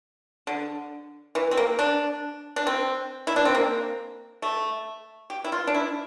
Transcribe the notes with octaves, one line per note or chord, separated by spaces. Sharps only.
D3
E3
C4
A#3
D4
D4
C4
E4
D4
C4
A#3
A3
G4
E4
F4
D4
E4